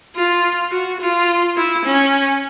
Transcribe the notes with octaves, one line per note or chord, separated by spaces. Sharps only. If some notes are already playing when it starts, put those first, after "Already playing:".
F4
F#4
F4
E4
C#4